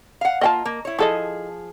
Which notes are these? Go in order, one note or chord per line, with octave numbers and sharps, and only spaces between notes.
F5 F#5
A#3 F4 D#5 G5 A5
A#3
E4 C#5
F3 E4 G#4 A4 D#5